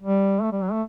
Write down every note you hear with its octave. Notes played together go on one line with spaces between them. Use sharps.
G3
A3
G3
F#3
A3